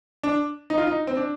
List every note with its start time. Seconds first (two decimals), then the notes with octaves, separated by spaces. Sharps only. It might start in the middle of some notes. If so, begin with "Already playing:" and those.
0.23 D4
0.70 D#4
0.78 F4
0.87 D#4
1.07 C4
1.17 D4